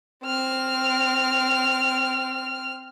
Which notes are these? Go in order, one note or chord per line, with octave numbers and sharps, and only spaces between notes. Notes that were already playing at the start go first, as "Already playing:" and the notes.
C4 F6